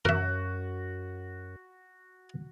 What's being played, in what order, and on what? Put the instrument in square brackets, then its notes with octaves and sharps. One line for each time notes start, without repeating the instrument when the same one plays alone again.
[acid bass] F#2 [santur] F#4 [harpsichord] A#4 E5